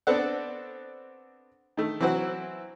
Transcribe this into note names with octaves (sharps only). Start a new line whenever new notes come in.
B3 C4 D4 A4 D5 F#5
D#3 A3
E3 F#3 C4 E4 F#4